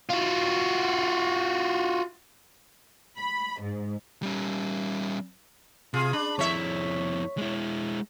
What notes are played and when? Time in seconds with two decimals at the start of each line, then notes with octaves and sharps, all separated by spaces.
0.09 F4 F#4
3.17 B5
3.61 G#2
4.22 G3 C#4
5.94 C3 F4 G#4
6.13 D4 B5
6.39 F2 E4 C#5 E5
7.38 G#3 E4